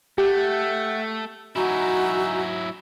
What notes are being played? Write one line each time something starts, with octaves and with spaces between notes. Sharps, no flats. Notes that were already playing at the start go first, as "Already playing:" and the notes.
A3 G4 E5 F#5 G5
F#3 C#4 D#4 E4 F#4